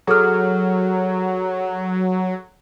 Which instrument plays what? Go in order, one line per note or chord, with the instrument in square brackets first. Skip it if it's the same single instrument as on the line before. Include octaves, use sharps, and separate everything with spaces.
[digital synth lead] F#3 [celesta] G#4 A4 F6